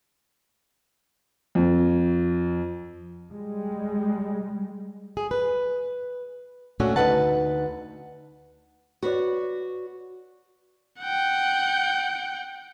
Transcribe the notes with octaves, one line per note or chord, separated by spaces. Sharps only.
F2
G3 G#3
G#4
B4
A#2 A3 C#4 D4 F#4
D2 F#3 D#4 B4 F#5 A5
F#4 B4 C#5 D5
F#5 G5